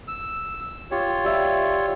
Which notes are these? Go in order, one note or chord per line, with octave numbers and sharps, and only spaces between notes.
E6
F4 G4 C#5
G3 E5